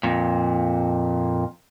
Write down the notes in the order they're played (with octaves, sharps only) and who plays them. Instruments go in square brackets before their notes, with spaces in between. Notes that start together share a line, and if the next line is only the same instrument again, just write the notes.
[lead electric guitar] F2 A#2